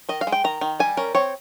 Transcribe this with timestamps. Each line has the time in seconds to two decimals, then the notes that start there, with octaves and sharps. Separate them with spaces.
0.09 D#3 D#5
0.21 F5
0.27 G#3
0.32 G5
0.44 D#3 A#5
0.61 D#3
0.80 G3 G#5
0.97 C#4 A#4
1.15 C4 C#5